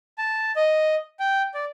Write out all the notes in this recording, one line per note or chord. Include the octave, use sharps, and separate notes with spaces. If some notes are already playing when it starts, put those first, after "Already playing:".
A5
D#5
G5
D5